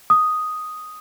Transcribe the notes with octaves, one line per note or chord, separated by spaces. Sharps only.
D#6